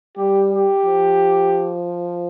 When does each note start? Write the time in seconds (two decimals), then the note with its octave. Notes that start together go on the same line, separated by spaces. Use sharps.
0.17 G3 G4
0.51 G4
0.86 F3